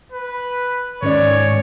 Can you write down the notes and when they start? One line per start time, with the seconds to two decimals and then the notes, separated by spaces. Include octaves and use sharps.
0.12 B4
1.03 G#2 D#3 C#4 C#5 D5